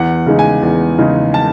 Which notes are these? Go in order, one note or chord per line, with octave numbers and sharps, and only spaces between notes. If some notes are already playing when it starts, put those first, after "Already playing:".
Already playing: E2 F#5
C#3 G#3 D#4
G#5
E2
C#3 G#3 D#4
A5